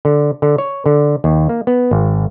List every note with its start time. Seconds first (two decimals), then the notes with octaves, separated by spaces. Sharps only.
0.05 D3
0.42 D3
0.58 C#5
0.86 D3
1.24 D#2
1.49 A#3
1.67 B3
1.91 G#1